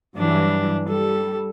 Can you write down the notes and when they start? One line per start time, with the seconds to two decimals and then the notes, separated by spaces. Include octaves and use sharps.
0.17 G2 E3 F#3 D4
0.88 G3 A4